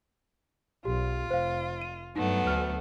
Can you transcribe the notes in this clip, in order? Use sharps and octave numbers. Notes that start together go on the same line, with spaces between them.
B1 F4 G4
F1 C5 F5
D#7
G2 F#3 A3 B3 D#4
D2 F6